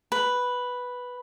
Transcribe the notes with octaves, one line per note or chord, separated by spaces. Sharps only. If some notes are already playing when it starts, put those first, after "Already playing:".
B4